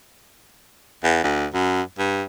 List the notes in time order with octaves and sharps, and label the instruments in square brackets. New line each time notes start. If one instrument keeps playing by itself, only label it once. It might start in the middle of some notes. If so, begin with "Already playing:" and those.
[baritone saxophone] E2
D2
F#2
G2